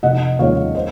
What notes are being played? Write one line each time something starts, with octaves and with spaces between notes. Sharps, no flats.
F1 D#5 F#5
D#2 C#3 F3 G#3 C#5 F5
C5 D#5